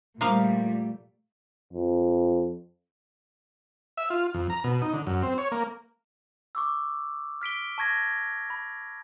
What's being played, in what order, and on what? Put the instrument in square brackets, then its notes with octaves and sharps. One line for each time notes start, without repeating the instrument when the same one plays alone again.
[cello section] A#2 G3 A3 [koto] F3 A#3 F5
[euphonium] F2
[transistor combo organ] E5
F4
F2
A#5
B2
D#4
D3
F#2
C4
C#5
A#3
[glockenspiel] C#6 D6 E6
F6 B6 D7 G7
A5 C#6 G#6 A#6
B5